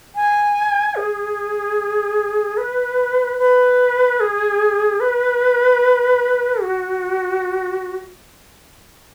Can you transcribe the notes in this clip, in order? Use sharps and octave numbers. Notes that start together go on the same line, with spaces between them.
G#5
G#4
B4
B4
G#4
B4
F#4